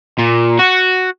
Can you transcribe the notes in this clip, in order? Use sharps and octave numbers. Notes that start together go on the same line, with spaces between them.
A#2
F#4